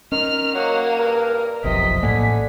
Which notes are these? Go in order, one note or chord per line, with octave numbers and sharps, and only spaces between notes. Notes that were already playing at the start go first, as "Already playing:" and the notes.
D#3 C#4 F6
F#3 A#3 F#5
G2 A#4
F#1 B1 F2 C3 D#5 B6
A1 A2 D3 A#3 G#5